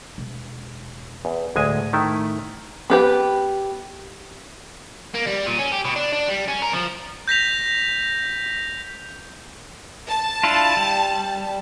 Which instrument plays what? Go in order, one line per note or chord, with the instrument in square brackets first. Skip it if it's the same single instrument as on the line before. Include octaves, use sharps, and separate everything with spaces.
[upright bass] E1
[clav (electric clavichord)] E2
[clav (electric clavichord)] D2 G#3 G#5 [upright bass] A2
[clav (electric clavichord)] D#3 A3 E4
[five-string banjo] B3 G4 B4
[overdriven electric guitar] A#3
G3
A#2
C#4
G4
B2
D4
D4
G3
C#4
A#4
F3
[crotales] G6 A#6 B6 F7
[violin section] A5
[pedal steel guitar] D4 E4 F4
G3